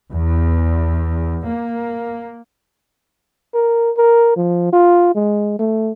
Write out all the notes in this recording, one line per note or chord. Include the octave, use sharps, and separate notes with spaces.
E2
A#3
A#4
A#4
F3
F4
G#3
A3